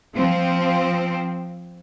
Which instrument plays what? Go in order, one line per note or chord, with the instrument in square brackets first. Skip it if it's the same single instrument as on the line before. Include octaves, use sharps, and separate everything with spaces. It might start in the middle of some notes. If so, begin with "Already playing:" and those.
[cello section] F3 C4